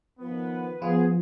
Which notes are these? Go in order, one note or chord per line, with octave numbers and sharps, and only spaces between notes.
D#3 F3 B3 B4
F3 B3 F4 G#4